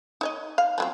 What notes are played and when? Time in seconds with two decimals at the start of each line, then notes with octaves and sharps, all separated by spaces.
0.21 D#4 C#5 D#5
0.58 F5
0.78 F3 F#3 C4